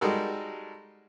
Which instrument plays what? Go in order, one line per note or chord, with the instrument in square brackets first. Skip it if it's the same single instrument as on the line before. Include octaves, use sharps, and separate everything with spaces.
[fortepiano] G3 G#3 D#4 F#4 A4 A#4